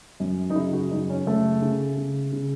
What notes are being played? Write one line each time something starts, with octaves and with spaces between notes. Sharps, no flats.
F#2
D#4
C#3 E4
F#4
F#2 D#4
C#4
C#3 A3
C#3
C#3
C#3